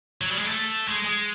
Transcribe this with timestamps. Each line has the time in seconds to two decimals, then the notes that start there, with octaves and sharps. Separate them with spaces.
0.21 F#3
0.30 G3
0.37 G#3
0.46 A3
0.88 G#3
1.04 G#3